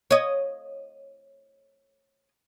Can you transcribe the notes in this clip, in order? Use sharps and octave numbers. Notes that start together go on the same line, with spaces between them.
C#5 D#5